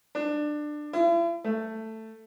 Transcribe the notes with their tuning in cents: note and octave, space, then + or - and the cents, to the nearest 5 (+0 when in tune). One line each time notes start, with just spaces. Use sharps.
D4 +20
E4 +45
A3 +10